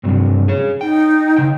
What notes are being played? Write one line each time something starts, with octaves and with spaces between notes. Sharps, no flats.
G2 C3 F#3
G#4 C#5
D#4 G5
C#3 G5